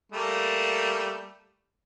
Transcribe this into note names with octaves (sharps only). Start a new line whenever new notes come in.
G3 A3 A#3